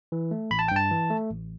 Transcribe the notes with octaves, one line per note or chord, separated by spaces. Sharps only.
E3
A3
A1 B5
A5
G2 G5
A5
E3
A3
A1